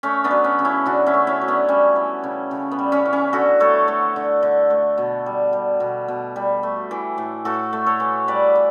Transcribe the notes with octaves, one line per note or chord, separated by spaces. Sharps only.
A3 C#4
B3 D4
F#3
C#4
C#3
C#4 E4
C#3 D4 F#4
C#4 E4
A3
C#4 E4
F#3
B3 D4
G3 C#4
E3
C#3
C#3
B3
G3
C#4
E3
C#4
D3 F#4 A4
A3 A4 C#5
A3
D3
D3
A3
B2
G3
G3
B2
B2
G3
A3
E3
A2
A2 F#4 A4
A3
A4 C#5
E3
G3 B4 D5
E3